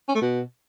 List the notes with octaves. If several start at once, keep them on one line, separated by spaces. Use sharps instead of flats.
C#4
A3
B2